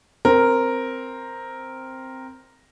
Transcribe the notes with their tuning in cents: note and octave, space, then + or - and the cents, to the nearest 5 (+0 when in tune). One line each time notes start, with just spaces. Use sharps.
C4 +0 A#4 +0